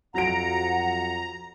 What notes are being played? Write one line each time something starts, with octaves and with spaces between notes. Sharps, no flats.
F2 F#3 F#5 A#5 D7